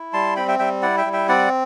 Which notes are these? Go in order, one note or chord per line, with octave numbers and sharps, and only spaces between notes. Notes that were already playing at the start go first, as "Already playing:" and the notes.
Already playing: E4
G3 A5 C6
C4 G5 B5
E5 G5
G3 E5 G5
E4 D5 F#5
E5 G5
G3
E5 G5
C4 D5 F#5